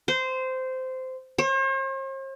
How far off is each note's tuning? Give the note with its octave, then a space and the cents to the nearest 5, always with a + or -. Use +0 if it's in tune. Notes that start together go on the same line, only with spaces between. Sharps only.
C5 -15
C5 +45